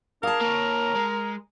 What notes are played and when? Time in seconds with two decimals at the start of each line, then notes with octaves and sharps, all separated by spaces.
0.23 D4 G#4 A#4 F5 A5
0.41 A#3 C#5 A#5
0.95 G#3